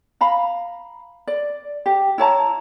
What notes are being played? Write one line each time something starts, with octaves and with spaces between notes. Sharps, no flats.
F5 A#5 B5
D5
G4
E4 C#5 A5 A#5